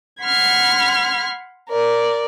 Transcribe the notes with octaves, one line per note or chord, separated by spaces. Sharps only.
F#5 B5 C6 F6 G#6
A#4 D5